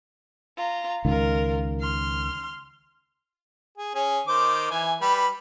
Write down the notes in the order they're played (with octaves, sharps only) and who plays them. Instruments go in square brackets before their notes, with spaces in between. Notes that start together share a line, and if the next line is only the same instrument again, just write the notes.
[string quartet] F4 A#5
[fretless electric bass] C#2 D#3 [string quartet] F4 A#4
[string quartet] C6 F6
[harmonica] G#4
C#4 G#4
D#3 C5 D6
E3 G#5
G3 B4 B5